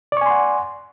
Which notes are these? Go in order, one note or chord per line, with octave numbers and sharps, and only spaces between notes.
D5 F#5 G#5 C6 C#6